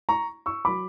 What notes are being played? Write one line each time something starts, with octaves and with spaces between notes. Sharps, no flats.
A#5 C#6
C#6 E6
F#3 B5 D6